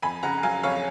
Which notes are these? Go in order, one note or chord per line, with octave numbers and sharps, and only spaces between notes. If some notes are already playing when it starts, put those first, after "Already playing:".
F2 G#5 B5
C#3 F#5 A#5
F#3 F5 G#5
F2 C#5 F5